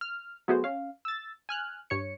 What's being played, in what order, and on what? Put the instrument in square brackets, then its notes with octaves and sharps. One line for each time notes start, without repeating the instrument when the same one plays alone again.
[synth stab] F6
F#3 A3 B3 F#4 G#4 C5
C#4 F5
E6 A6
G#5 F6 F#6
G2 C#5 C#7